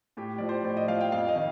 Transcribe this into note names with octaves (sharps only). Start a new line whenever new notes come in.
A2 G4
F3 D5
C5
A2 D5
D#5
F3 F5
G5
F2 F5
D#5
D#3